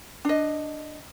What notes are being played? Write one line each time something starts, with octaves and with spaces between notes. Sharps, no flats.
D4 D#5